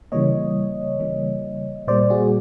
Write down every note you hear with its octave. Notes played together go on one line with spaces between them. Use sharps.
C#3 E3 G3 A#3 C#5 D#5
C#3 E3 G3 A#3
A#2 G3 A#3 C5 D5
F#4 G#4